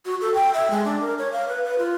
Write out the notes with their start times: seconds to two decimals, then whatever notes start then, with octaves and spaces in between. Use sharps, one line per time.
0.06 F#4
0.21 A4
0.34 G5
0.54 E5
0.71 G#3
0.85 D4
1.01 A#4
1.19 C#5
1.32 F5
1.48 B4
1.65 B4
1.79 F4